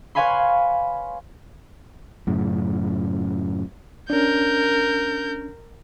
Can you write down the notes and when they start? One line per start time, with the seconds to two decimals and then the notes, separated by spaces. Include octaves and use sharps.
0.15 B4 C#5 F5 G#5 B5 C6
2.27 F#2 A2 C#3
4.10 C#4 D4 A#4 G6